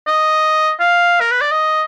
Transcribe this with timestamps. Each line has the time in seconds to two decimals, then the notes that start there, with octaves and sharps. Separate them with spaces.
0.07 D#5
0.80 F5
1.21 A#4
1.31 B4
1.41 D5
1.51 D#5